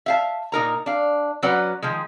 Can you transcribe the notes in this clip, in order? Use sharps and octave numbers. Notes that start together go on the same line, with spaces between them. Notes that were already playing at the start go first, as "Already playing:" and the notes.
E5 F5 A5
A#2 D#4 A#4 A#5
D4 F5
F#3 C#4 B4 D5 F#5 A#5
D#3 F3 G#3